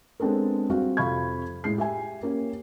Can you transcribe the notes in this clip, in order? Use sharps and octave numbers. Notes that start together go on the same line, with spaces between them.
G#3 B3 C4 D4 A4 A#4
G3 C4 F#4 F5
F2 C3 F5 B5 C#6 G#6
A2 G#3 C7
G4 E5 G#5
A#3 C#4 G4